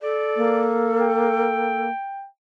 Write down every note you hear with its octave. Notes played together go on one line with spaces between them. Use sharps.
A4 D5
A#3
G5